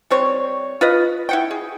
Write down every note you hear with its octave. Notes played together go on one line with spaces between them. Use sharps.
G3 C4 C#5
F4 B4 D#5
E4 F#5 G5
G#4